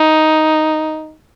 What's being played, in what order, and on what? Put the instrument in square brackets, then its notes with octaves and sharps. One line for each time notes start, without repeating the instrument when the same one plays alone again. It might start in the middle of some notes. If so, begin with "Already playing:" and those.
Already playing: [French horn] D#4